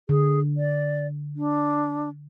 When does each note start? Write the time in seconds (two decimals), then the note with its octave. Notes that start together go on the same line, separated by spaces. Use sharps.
0.09 D3 G#4
0.57 D5
1.36 D4